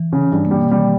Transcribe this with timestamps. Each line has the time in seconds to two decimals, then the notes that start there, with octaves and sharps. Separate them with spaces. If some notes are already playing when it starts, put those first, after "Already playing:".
Already playing: E3
0.13 C#3
0.32 G2 G3
0.45 A#3
0.51 G3
0.58 B2
0.71 D#3 G3